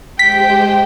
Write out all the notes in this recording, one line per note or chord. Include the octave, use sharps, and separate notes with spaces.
G#3 G4 C5 G5 B6